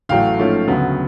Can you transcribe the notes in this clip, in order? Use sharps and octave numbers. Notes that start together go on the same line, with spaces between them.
A1 A2 F#3 A3 F5 G5
G#2 F3 A3 C#4
D2 C#3 F#3 B3